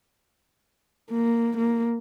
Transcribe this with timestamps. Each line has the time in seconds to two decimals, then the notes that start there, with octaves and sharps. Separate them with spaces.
1.11 A#3
1.57 A#3